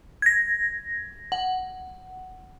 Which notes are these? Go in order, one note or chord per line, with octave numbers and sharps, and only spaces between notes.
G#6 A#6
F#5